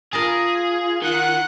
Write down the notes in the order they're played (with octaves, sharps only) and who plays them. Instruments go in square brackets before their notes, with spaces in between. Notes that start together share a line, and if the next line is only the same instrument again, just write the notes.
[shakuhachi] F4 [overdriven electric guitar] G#4 [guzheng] A#4 D#5 A5
[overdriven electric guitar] D#3 [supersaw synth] F#5 F#6